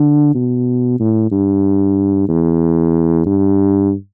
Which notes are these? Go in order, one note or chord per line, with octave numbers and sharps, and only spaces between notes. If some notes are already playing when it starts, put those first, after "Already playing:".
Already playing: D3
B2
A2
G2
E2
G2